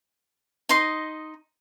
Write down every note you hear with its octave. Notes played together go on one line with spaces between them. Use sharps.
D#4 D#5 C6